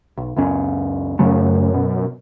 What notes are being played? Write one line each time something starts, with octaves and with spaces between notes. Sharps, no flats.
B1
C#2 F#2 C#4
F#2 C#3 F#3 A3
B2